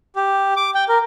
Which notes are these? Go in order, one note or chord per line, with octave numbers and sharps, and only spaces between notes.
G4
D6
G5
A#4